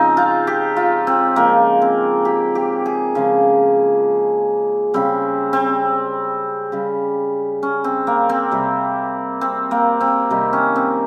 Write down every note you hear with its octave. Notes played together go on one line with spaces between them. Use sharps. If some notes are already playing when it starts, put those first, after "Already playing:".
Already playing: C#3 F3 G#3 C4 D#4
F4
G4
F4
C4
C#3 F3 G#3 A#3
C4
G4
G4
G#4
C#3 F3 G#3
C#3 G3 C4
C4
C#3 G3
C#4
C4
A#3
C4
C3 G3
C4
A#3
C4
C3 D#3 G3 D#4
C#4
C4